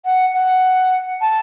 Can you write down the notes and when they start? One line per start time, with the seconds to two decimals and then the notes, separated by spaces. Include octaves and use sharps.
0.05 F#5
0.34 F#5
1.21 A5